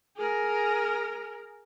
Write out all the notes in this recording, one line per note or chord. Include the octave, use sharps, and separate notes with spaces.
G#4 A#4